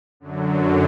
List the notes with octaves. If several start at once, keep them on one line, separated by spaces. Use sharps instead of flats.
F#2 D3 F#3